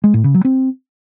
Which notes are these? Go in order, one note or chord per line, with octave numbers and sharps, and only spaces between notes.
G#3
A2
C#3
F#3
C4